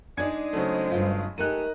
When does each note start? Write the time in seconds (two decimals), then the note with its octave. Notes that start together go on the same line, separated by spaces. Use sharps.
0.17 G#3 D4 D#4 D5 G#5 G#6 C#7
0.53 C#3 F#3 A3 C5
0.91 G2 F4
1.38 A3 D#4 G4 A#4 G#5 F#6 D#7